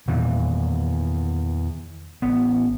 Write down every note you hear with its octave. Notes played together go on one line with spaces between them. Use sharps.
E2 A#2 D#3 E3
A1 B3